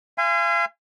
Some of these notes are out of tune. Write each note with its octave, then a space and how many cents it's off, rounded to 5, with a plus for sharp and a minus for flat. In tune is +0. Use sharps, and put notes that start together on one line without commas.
F5 -40 G#5 -15 C6 -35